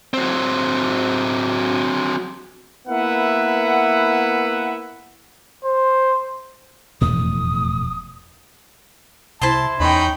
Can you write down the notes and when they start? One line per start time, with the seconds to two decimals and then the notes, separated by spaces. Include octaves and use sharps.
0.14 F#3 C4
2.88 A#3 B3 E4 B4 E5 F#5
5.64 C5
7.01 E1 F2 A2 E3 A3 B3 D#6
9.42 C2 E4 C5 A5 C6
9.80 E2 C#4 D#4 G5 B5